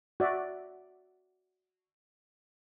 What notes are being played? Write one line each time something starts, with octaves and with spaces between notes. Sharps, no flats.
F#4 D5 E5